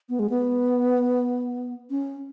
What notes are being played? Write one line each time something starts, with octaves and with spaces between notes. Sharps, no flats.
B3
G#3
B3
C#4